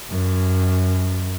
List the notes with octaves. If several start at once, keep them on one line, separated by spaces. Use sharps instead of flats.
F#2